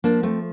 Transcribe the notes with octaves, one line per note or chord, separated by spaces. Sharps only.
F3 A#3 D4
A3 C4